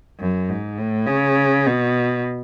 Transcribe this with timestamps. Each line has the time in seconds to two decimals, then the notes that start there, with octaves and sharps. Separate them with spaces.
0.20 F#2
0.49 G#2
0.79 A2
1.07 C#3
1.66 B2